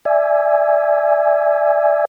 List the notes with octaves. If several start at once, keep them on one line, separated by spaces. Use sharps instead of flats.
D5 E5 G#5